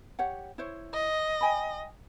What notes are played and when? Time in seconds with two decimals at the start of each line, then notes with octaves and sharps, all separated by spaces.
0.19 G4 C#5 F#5
0.58 E4 C5 C#5
0.93 D#5
1.41 G5 G#5 B5